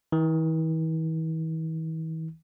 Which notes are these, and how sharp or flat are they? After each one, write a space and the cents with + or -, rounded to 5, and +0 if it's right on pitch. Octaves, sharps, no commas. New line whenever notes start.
E3 -45